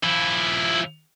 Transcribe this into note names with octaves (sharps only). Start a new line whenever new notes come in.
F3 E4